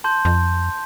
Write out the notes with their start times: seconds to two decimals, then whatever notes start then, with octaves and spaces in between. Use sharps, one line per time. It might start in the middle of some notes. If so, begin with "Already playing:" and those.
0.04 A5 C6 G6
0.25 F2